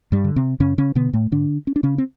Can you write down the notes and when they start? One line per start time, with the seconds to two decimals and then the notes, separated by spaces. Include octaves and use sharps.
0.12 G2 G3
0.24 D3
0.36 C3 C4
0.60 F#2 C#3 C#4
0.78 C#3 C#4
0.95 B2 D3 B3
1.13 A2 A3
1.31 G#2 D3 D4
1.67 C#4
1.76 D4
1.83 C#3 C#4
1.98 C4